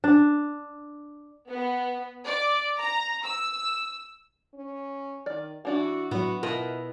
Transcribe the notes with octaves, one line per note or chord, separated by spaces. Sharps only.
D4
B3
D5
A#5
E6
C#4
D#3 D5 F6
E3 D4 E4 F#4
A2 F#3 B3 F#4
B2 E4 F4 A#4 D#5